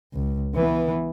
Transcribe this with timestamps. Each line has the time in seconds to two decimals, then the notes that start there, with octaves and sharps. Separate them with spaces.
0.13 C#2
0.55 E3 B3